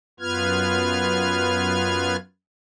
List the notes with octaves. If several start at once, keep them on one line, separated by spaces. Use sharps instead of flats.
F#2 B3 F4 B4 F6 G#6